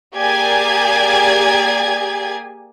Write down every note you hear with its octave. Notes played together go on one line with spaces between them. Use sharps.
A#3 G4 G#4 D5 G#5 G#6